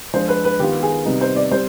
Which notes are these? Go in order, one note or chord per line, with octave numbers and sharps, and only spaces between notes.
F3 G#3 D4 F4 C5
B4
B4
D#3 B3 F4 G4
G#4
C3 G3 B3 D#4
C5
D5
G3 C4 C5